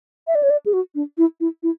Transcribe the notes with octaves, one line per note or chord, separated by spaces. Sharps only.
E5
D5
C#5
D5
G#4
F#4
D4
E4
E4
E4